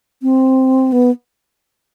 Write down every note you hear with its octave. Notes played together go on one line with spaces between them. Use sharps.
C4
B3